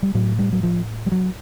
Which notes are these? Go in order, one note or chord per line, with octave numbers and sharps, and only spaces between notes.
G3
A2 F#3
G3
F#3
F3
G3
F#3